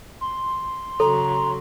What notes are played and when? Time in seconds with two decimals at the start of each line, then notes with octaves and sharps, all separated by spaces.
0.21 C6
1.00 C#3 F#3 A4 A#5